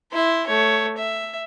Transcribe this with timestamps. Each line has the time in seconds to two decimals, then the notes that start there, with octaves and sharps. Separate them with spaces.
0.13 E4 C6
0.47 A3 C#5
0.97 E5